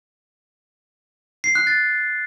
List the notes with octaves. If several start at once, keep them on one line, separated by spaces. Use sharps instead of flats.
C7
F#6
A6